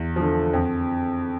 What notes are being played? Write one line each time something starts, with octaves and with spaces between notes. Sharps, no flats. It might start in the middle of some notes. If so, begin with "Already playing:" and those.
Already playing: E2
D3 F3
F2